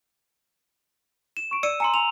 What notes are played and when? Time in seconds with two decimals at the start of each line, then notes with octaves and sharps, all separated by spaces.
1.37 E7
1.51 C#6 D7
1.63 D5 E6 C#7 D#7
1.80 G#5 A#5 C6 C#7
1.94 G#5 C6 F7